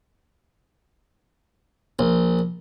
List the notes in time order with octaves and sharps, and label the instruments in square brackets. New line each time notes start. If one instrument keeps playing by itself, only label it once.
[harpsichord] A#1